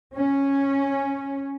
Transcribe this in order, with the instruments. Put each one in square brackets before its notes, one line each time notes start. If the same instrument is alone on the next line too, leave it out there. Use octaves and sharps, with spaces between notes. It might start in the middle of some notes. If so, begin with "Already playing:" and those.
[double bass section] C#4